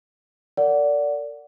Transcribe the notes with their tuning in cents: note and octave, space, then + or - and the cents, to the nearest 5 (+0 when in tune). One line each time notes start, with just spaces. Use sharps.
A#4 -40 D5 -20 F#5 +0